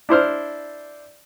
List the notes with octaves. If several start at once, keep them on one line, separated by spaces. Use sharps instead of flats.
D4 E4 C5 F6